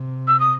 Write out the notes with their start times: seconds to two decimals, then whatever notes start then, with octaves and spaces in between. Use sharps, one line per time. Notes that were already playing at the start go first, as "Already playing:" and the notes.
Already playing: C3
0.28 E6
0.40 D#6